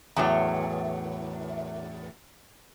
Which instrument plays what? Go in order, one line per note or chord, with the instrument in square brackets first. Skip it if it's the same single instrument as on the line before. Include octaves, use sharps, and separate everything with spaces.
[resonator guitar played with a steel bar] E2 A2 F#3